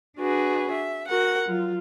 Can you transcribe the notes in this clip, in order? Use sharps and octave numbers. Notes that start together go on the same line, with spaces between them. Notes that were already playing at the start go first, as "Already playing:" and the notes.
D4 F#4 G#4 B4
E5
F#4 A#4 F#5
F#3 F4